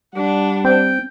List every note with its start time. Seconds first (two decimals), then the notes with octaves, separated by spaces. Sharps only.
0.15 G3 D4 F#5
0.65 C4 G5